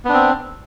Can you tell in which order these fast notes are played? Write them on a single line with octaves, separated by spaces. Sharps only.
B3 D4 C4